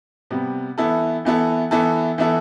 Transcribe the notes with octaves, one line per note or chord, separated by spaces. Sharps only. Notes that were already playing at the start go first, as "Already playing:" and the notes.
C3 G3 B3
E3 B3 E4 A4
E3 B3 E4 A4
E3 B3 E4 A4
E3 B3 E4 A4